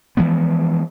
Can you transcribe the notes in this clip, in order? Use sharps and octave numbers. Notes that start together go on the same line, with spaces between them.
E3 F3 G#3 B3